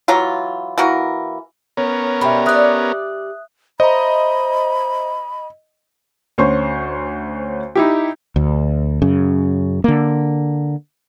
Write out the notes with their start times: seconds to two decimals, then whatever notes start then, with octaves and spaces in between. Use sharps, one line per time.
0.08 E3 F#3 F4 A#5
0.78 E3 A#3 F#4 A#4
1.77 B3 C#4 A#4 C#5
2.21 B2 G3 C5 E5 G5 B5
2.46 G3 D5 E5 D#6 F#6
3.80 C5 D#5 E5 A#5 B5
6.38 D2 C#4 C5 C#6
7.75 D#4 E4 G4
8.36 D2
9.02 F#2 C#3
9.84 D3 A#3